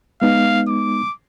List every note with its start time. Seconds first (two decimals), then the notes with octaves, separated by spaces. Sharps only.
0.22 G#3 B3 D#4 F5
0.68 D6